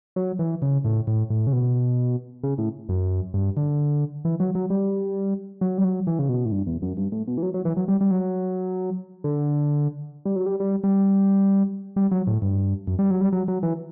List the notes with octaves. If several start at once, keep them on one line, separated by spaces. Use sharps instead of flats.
F#3
E3
C#3
A2
A2
A2
C#3
B2
C#3
A2
F#2
G2
D3
E3
F#3
F#3
G3
F#3
G3
F#3
E3
C#3
B2
A2
G2
E2
F#2
G2
A2
B2
E3
F#3
F#3
E3
F#3
G3
G3
F#3
D3
G3
F#3
G3
G3
G3
G3
F#3
A2
G2
F#2
G3
F#3
G3
F#3
F#3
E3